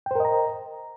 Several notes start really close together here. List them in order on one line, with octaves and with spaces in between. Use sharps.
G5 C5 A#4 D#5 A#5